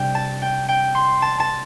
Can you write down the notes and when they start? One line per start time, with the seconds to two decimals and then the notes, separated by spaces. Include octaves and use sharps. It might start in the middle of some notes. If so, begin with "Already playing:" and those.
Already playing: C3 G3 D4 G5
0.15 A5
0.42 G5
0.68 G5
0.95 C6
1.22 A5
1.40 A5